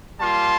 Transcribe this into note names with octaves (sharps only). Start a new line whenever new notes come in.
G3 A#3 F4 A5 C6